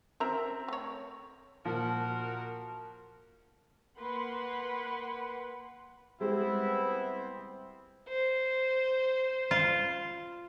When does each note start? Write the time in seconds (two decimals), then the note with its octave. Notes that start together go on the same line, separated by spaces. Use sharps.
0.20 C4 C#4 A#4 E5 A#5
0.68 A3 C#5
1.65 A#2 F3 F#4 A#4 A5
4.00 A#3 B4 F#5 B5 C6
6.21 G3 G#3 B3 C4 E4 C5
8.08 C5
9.51 F4